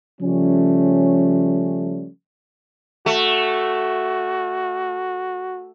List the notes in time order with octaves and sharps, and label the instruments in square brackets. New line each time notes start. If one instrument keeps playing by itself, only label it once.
[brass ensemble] C#3 F3 G3 A3 C#4
[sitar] A3 [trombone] F#4